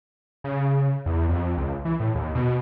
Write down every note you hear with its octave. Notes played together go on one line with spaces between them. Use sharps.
C#3
E2
F2
C#2
E3
A2
D#2
B2